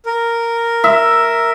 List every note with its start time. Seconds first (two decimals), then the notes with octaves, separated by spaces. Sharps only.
0.06 A#4
0.84 E5